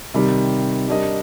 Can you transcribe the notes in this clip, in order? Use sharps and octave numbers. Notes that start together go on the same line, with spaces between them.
C3 D#3 G3
G3 D4 G4 A#4 D#5